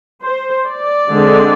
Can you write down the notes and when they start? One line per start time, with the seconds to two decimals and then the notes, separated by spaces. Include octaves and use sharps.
0.23 C5
0.67 D5
1.11 D3 G#3 C4